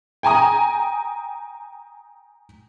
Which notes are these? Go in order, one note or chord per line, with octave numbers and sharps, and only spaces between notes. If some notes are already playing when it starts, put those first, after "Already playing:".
G5 G#5 A#5 D#6